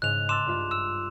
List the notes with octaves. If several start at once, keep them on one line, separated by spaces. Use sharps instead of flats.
G#2 C#3 F#6 F7
A5 C6 D6 E6 A6 E7
G2 F4 E5
E6 E7